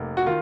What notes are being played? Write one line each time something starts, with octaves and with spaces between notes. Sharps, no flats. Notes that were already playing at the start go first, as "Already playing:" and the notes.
Already playing: F1 A#3
F#4
D#3 F4